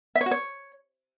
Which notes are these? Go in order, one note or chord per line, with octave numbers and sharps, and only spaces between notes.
E5
C#5
F#4
C#5